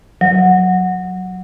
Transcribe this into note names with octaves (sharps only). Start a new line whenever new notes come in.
F#3